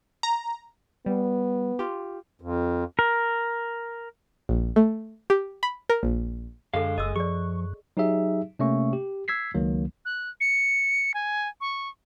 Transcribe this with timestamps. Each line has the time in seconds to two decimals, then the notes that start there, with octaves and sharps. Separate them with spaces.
0.23 A#5
1.06 G3 B3
1.79 F4 G4
2.42 F2
2.99 A#4
4.49 A#1
4.76 A3
5.30 G4
5.63 B5
5.89 A#4
6.03 A#1
6.74 F#2 D3 G#3 G#4 A4 F5
6.98 F#1 G#3 G#4 D#5 E6
7.16 F3 G#4 D5 C#6
7.97 F#3 D#4 G4 G#4 E5
8.59 C3 A3 A#3 C#4 E5 C#6
8.93 G4
9.28 E6 G#6 B6 C7
9.55 C#2 D#3 F#3 A#3
10.05 F#6
10.40 C#7
11.14 G#5
11.61 C#6